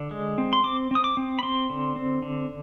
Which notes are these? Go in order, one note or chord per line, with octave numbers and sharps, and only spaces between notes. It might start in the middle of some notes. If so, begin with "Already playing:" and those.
Already playing: D3
G#3
C4
C6
C4 D6
C4 D#6
D6
C4
B5
C4 C6
D3
C4
D3